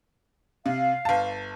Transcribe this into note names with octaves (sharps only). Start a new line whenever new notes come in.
C3 F5
G1 A5